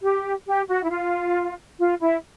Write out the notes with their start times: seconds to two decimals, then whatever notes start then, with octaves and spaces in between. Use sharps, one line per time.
0.01 G4
0.46 G4
0.68 F#4
0.83 E4
0.90 F4
1.78 F4
2.00 E4